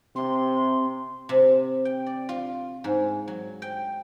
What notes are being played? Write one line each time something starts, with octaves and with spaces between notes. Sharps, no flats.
C3 C4 C6
C3
G5
D5
F4
G#2
F#3
G5